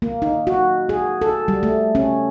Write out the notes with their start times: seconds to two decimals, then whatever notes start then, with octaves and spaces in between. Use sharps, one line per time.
0.02 A#3
0.22 D#4
0.47 F#4
0.89 G#4
1.22 A4
1.48 G3
1.63 A3
1.95 C#4